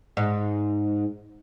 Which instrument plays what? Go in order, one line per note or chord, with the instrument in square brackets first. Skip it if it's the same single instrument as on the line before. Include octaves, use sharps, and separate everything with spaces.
[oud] G#2